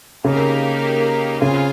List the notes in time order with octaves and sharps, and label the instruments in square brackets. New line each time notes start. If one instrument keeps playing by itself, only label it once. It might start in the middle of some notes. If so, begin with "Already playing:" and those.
[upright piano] C#3 [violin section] A#3 D#4 G4 A#4 F5
[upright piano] C#3 [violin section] F4 C5 F5 G#5